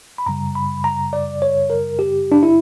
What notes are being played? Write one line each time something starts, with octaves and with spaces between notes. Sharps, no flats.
B5
F#2 C#3 G3 A#5
B5
A#5
D5
C#5
A#4
G4
D4
E4